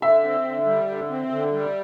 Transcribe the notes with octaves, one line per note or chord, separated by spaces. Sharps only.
D3 E5
C4
D3
G3
D3
C4
D3
G3